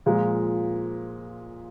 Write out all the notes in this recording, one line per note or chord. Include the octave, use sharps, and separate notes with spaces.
A#2 F3 G#3